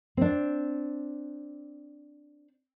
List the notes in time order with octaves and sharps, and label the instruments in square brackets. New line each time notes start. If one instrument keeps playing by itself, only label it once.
[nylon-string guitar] C4 D4